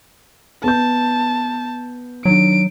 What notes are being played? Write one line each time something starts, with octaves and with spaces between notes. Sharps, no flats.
B3 A5 G6
D#3 F#3 D4 D7